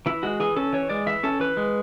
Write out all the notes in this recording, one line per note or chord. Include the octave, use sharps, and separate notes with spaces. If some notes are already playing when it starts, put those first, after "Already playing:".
E3 E4
G#3 F#4
E3 G#4
C#4 A4
E3 C#5
G#3 D5
E3 E5
C#4 A4
E3 B4
G#3